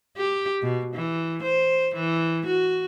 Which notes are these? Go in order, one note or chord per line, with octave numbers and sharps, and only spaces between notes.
G4
B2
E3
C5
E3
F#4